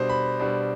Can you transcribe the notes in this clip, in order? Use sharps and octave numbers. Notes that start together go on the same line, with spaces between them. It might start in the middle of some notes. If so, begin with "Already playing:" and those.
Already playing: B2 G3 D4 C5
B5
B2 G3 D4